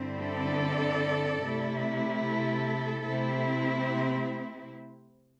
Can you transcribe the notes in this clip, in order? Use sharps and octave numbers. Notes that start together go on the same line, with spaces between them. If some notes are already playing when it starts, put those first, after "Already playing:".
Already playing: G2 D3 C4 E4
A4 D5
C3 A3 E4
A4
C3 A3 C4 E4